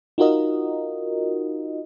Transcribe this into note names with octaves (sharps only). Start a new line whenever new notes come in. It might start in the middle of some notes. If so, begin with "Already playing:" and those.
D#4 F4 F#4 A#4 D#5